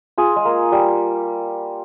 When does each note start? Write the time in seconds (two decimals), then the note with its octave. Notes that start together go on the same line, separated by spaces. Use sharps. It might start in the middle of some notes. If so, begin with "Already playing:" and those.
0.18 F4 G#4
0.36 G#3
0.45 A#3
0.72 G3